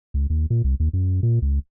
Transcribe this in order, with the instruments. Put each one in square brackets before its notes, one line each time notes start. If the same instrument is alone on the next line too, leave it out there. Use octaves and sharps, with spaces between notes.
[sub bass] C#2
D#2
A#2
C2
D#2
F#2
A#2
C#2